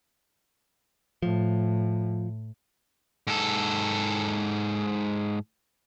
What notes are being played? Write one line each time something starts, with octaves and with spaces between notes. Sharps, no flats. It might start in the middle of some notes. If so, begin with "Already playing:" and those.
A2 F3
G#2 A4